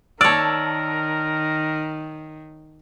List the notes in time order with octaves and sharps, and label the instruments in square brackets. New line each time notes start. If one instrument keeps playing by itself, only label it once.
[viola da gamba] D#3 [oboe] A#4 [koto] C#5 D5 [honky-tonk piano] A5 E6